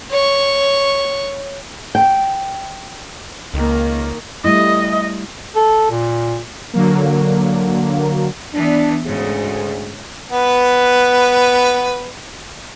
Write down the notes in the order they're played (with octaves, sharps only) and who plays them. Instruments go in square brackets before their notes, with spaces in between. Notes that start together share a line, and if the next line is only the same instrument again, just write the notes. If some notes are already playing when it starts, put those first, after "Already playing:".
[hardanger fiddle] C#5 C#6
[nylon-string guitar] G5
[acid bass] C#2 [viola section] D#3 A#3
[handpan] G3 A3 E4 [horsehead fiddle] D#5
[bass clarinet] A4
A#2
[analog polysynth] D3 F#3 A#3
[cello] E3 B3 [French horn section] D4
[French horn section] D2 G#4 [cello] G#2 C#3
[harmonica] B3 B4